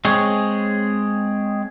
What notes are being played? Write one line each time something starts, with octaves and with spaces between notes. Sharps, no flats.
G#3 C4 G#4 C#5